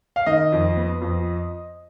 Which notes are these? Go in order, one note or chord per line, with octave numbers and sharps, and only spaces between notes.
F5
D#3 D#5
F2
B3
F2